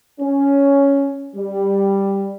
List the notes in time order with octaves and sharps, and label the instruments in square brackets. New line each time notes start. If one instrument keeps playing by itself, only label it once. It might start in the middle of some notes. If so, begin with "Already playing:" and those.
[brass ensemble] C#4
G3